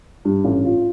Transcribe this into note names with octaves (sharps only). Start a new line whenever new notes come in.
G2
A1
F4